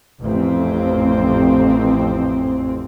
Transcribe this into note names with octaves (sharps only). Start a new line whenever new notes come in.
A1 F2 C4